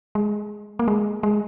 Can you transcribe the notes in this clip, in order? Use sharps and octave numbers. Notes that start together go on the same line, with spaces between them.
G#3
A#3
G#3
G#3